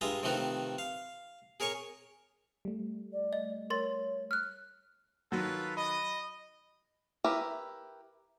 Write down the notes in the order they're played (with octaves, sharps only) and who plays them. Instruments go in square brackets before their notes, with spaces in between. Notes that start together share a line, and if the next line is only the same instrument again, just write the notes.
[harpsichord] G2 G#3 F4 D#5 E5 A#5
C3 D#3 F3 A3 D#4 B4
F5
G#4 A#4 C#5 G#5 C#6
[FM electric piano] G3 A3
[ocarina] D5
[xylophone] D#5
[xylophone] A#4 C6 A6 [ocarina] C#5
[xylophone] F6 F#6
[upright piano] D#3 F#3 F#4 [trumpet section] F4 A4 B4
[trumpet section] D#5 [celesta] B5
[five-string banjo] E4 G4 A#4 B4